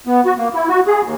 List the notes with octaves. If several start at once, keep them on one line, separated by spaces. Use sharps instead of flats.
B3
F#4
A#3
E4
F#4
G#4
D#2